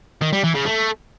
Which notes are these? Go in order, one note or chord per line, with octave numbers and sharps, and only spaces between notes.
D#3
G3
E3
C#3
A3